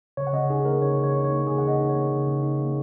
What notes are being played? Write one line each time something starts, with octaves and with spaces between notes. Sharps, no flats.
C#3 C#5
F#5
C#3 D#5
D#4 G#4
A#3 A#4
C#3 C#5
C#3
C#5
D#4
C#5
A#3
C#3 G#4
C#3 F#5
D#5
D#4
C#5
A#3
C#3
C#3
D#4
A#3